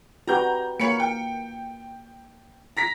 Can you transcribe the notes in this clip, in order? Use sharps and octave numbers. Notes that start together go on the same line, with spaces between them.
F#4 G4 B4 A#5 G6
A#3 C#5 B5 C#7
G5
A#5 A#6 B6